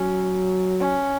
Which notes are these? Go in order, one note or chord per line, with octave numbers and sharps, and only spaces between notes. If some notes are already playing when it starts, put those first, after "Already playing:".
Already playing: F#3 C#4
C#4